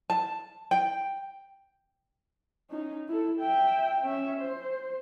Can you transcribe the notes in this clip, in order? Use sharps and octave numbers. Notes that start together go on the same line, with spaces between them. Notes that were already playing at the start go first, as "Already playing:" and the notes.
A5
G5
C#4 D#4
E4 A4
E5 G5
C#4 E5
C5